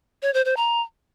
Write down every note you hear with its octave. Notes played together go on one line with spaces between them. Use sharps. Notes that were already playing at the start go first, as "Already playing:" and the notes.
C#5
C5
C5
A#5